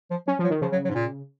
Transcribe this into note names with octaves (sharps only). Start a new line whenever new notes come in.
F3
F#3 C#4
F3 F#3
D#3
C#3 F3
F#3
F#3
G#2
A#2